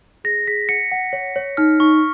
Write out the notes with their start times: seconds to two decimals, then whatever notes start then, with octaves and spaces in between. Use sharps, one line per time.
0.24 G#4 A#6
0.47 G#4 B6
0.69 F#5 C#7
0.92 F#5
1.13 C#5
1.36 C#5
1.57 D#4 F6
1.80 D#4 C#6